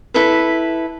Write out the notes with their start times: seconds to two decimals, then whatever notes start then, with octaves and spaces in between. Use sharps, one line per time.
0.14 E4 A4 B4